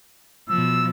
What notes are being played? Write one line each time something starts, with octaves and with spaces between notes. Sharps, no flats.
B2 F3 E6